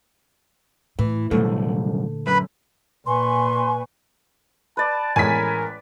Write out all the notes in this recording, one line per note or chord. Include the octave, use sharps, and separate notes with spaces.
A2 E3
C2 F#2 A#2 D3 A3
F#2 B4 B5
A#2 B4 G#5 C6 C#6
B4 D5 A5
A1 G#3 A#4 G#5 B6